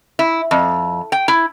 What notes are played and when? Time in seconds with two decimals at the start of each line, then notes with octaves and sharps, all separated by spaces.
0.19 E4
0.51 F2
1.12 G5
1.28 E4